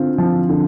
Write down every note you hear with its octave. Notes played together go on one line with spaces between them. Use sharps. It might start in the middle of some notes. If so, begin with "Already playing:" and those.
Already playing: D3 C4 F4
F3
D3